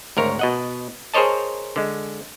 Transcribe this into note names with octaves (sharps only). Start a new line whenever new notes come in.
G#1 D2 A#4 C#5
B2 D#5 F#5
G#4 A#4 C5 C#5 D#5 A5
D3 G#3